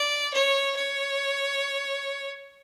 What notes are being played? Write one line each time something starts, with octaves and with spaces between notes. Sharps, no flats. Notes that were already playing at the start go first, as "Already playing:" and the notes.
Already playing: D5
C#5
C#5